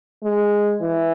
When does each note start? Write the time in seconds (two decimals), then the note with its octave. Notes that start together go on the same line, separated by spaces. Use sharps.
0.24 G#3
0.81 E3